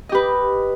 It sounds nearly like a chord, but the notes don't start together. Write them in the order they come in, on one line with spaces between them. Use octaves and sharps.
D#5 G4 B4